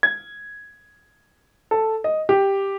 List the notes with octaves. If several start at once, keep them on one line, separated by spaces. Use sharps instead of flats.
G#6
A4
D#5
G4